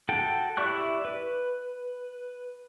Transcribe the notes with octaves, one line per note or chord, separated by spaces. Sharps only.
F#4 A4 G5
E4 G4 D5 C#6 F#6
B4